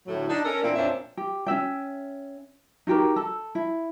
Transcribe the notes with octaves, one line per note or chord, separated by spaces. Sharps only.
D2 A2 F#3
D4 D#4
C#4 A4 A#4
A#2 E3 A#3 C4 D4
F2 A#2 C#4 D4 C5 E5
G4
C#4 F#4 E5 G5
D#4 F#4 G4 A#4
A4
E4